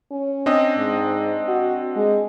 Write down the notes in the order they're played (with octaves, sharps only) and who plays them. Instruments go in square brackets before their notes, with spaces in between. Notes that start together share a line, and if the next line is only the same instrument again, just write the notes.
[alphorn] C#4
[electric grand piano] C4 D4 D#5
[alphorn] G#2
F#4
G#3